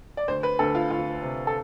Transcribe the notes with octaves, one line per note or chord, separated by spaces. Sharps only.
D5
D2 C5
B4
D2 A4
F4
D2 F4
C3
A4